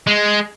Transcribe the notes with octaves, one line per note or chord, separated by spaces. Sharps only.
G#3